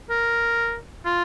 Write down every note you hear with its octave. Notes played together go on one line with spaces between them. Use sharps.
A#4
F4